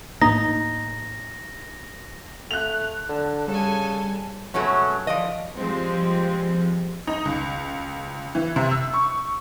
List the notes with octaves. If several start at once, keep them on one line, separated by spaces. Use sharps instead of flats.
A2 A#3 D#4 A#6
A3 F#6 F7
D3 A5
C#3 G3 A4 G#5
B2 F#3 G#3 A3 C#4
F3 D5 D#5
F3 G3 G#3 C4
D#4
C#2
E3
C3
E6
C#6